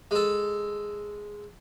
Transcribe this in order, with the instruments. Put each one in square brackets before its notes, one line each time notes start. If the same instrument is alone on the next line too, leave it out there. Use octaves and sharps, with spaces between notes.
[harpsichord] G#3 A4